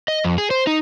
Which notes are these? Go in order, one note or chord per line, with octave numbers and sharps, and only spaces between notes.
D#5
F2
G#4
C5
D#4